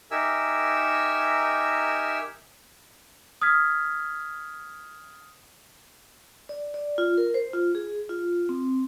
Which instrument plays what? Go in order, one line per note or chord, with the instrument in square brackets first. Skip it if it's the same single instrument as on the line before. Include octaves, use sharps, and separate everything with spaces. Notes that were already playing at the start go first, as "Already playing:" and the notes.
[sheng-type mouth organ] D#4 G4 A#4 E5 G#5 E6
[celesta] D#6 F6 G#6 B6
[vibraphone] D5
D5
F4
A#4
C5
F4
G#4
F4
C4